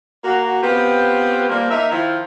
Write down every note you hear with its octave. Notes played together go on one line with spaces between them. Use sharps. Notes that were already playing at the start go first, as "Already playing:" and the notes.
A#3 F#4
B3 C4 F4 G4 B4
F3 G3 A#3
A#3 D#4 E5
D#3 F3 E4